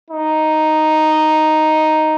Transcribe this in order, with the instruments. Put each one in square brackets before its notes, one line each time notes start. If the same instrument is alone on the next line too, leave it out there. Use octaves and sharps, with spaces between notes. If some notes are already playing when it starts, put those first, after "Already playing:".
[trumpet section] D#4